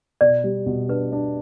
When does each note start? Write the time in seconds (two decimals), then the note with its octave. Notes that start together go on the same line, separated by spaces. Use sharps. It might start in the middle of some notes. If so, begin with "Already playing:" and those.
0.21 B2 D5
0.44 G3
0.66 B2
0.89 D4 B4
1.12 D4